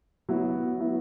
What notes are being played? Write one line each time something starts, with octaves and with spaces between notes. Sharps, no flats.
F#3 B3 E4
F#3 B3 E4